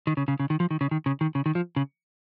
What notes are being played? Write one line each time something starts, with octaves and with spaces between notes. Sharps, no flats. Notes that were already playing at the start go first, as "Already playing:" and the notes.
D#3
C#3
C#3
C#3
D#3
F3
D#3
C#3
D#3
C#3
D#3
C#3
D#3
F3
C#3